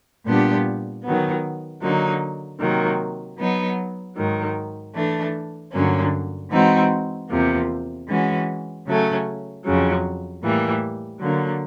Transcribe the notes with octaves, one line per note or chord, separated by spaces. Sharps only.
A#2 G3 B3 D4 G4
D#3 F#3 B3
D3 F#3 A#3 D#4
C3 D#3 F#3 A#3
F#3 B3 D#4
G#2 D#3 F#3
E3 A3 D4
G2 D3 F#3 A#3 C#4
E3 G#3 C4 D#4 F#4
E2 C3 F3 A#3
E3 G#3 C#4 F#4
C#3 F#3 A3 C#4
F2 C#3 F#3
A2 E3 G3 A#3
D3 F#3 A#3